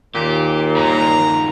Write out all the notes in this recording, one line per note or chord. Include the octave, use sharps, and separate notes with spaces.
D#2 A#2 G4
G2 D#3 A#5